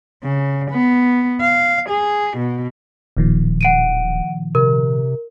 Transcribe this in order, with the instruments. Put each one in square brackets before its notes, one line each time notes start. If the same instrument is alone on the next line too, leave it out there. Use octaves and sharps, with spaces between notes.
[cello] C#3
B3
F5
G#4
B2
[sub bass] D1 [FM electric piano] A#2 D#3 F3
[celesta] F#5 D7 D#7
[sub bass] C3 [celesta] A#4